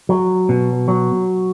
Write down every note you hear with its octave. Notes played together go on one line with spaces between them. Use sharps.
F#3
B2
F#3